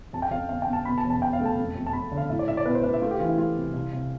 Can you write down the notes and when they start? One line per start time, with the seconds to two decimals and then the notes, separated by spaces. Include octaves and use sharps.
0.13 F2 A5
0.22 G5
0.31 F2 F5
0.49 G1 F5
0.62 G1 G5
0.73 A5
0.85 B2 B5
0.98 A5
1.04 E1
1.10 A5
1.21 E1 G5
1.33 F5
1.39 A3
1.45 A5
1.57 F2
1.75 F2
1.86 A5
1.93 F2 B5
2.12 D3
2.18 F5
2.30 A2 E5
2.39 D5
2.48 A2 E5
2.57 D5
2.66 B1 B4
2.75 C5
2.84 A2 B4
2.93 E5
3.01 A3 F4
3.11 G4
3.20 E3 F4
3.29 E4
3.38 A3 F4
3.56 C3
3.73 C2
3.92 C3